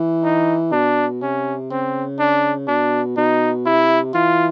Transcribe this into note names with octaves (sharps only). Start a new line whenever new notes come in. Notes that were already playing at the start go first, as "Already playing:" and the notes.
Already playing: E3
D#4
B2 D4
C3 C#4
C#3 C4
D4
B2 D4
B2 D#4
C3 E4
E3 F4